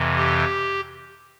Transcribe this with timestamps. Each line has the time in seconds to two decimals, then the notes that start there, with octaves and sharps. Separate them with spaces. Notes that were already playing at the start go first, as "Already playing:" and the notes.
Already playing: F2 C3 E3
0.17 G4